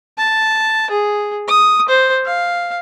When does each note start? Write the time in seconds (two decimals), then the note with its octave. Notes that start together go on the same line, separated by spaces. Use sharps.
0.18 A5
0.90 G#4
1.48 D#6
1.89 C5
2.25 F5